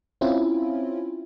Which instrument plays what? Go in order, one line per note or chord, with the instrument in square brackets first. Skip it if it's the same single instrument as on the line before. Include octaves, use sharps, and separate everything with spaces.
[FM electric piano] C4 C#4 E4 F4